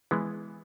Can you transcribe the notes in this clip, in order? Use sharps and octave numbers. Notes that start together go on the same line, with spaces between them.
E3 G#3 B3